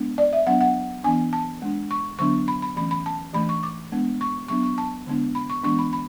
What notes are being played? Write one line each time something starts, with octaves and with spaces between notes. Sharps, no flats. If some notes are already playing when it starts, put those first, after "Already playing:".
Already playing: G#3 B3 D4
D5
E5
F#3 B3 D4 F#5
F#5
E3 B3 D4 G#5
A5
G#3 D4
C#6
D3 F#3 B3 D4 C#6
B5
B5
E3 A3 C#4 B5
B5
A5
E3 A3 D4 B5
C#6
D6
G#3 B3 D4
C#6
F#3 B3 D4 C#6
C#6
A5
D3 G#3 B3 D4
B5
C#6
E3 G#3 B3 D4 C#6
B5
B5